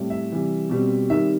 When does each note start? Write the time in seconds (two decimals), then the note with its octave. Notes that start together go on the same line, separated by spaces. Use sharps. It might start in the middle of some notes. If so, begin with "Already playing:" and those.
Already playing: A2 G3 C4
0.10 E5
0.30 C3 E3 G3
0.70 B2 G3 C4
1.10 D#3 G3 C4 E5